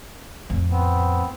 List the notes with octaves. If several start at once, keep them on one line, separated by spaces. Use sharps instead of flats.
F2 A2
B3 C4